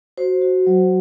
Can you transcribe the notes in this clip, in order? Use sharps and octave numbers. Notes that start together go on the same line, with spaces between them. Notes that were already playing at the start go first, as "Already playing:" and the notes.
F#4 C5
F#4
F#3